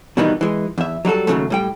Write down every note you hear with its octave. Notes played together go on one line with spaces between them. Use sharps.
B2 D#3 E3 G3 B3 D#4
E3 G#3
E2 E5
F#3 G3 F#4 A4
D#2 A2 C#3 F#3 A3
A2 G3 G5